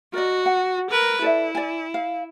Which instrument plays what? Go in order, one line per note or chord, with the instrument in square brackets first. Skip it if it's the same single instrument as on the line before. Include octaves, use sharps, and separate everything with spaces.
[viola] F#4 [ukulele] A#4 D5 D#5
[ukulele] F#5
[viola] A#4 B4
[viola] E4 [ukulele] A4 D5 E5
[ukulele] D5 G#5
F5